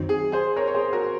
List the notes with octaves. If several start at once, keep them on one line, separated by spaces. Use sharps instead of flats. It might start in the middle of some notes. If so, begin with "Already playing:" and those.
Already playing: F#2 D#3 F#3 C4 D#4
G#4
G#4 C5
A#4 C#5
C#5
G#4 C5
F#4 A#4